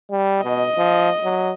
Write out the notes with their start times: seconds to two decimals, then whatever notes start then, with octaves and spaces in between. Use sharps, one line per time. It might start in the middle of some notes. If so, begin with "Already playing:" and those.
0.11 G3
0.44 B2 D#5
0.78 F3
1.24 F#3